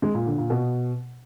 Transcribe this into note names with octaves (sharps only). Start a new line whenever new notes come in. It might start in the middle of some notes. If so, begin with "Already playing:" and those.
G#3
A#2
D3
A#2
B2